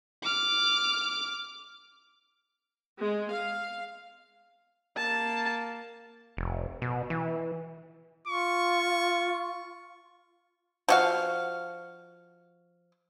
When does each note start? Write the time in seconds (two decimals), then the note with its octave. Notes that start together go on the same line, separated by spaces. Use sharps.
0.22 D6 F6
2.99 G#3
3.31 F5
4.97 A#3 A5
6.37 F1
6.82 B2
7.10 E3
8.28 F4 C#6
10.89 F3 F#4 F5